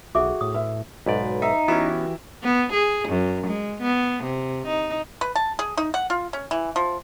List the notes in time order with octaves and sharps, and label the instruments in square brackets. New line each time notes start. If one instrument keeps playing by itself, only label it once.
[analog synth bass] B1 [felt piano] F#4 G#4 F#5 [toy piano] A4 E5 D6
[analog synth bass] A2 [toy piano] D#6
[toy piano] F#4 B4 [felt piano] E5
[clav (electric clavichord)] B1 G#2 D5 [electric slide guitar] B4
[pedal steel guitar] D#4 [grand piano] E5
[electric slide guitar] E3 F#4 G4 [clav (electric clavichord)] B3 C#4 [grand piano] E4
[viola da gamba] B3
G#4
F#2
G#3
B3
C3
D#4
[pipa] B4
A5
G#4
D#4
F#5
F4
C#4
E3
F3